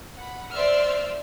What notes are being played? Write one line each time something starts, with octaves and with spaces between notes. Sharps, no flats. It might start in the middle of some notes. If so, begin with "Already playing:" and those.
F#5 B5
C5 D5 E5 C6 E6 F6